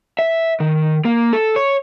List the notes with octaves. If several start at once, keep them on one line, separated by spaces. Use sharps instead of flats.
E5
D#3
A#3
A4
C#5